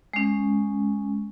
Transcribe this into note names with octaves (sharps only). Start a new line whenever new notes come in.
G#3 C#4